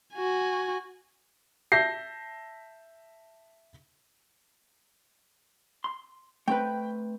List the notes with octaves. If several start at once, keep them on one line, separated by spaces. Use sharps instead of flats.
F#4 G#5
E5 A5 G6 A#6 C7
C6
A3 C4 B4 G5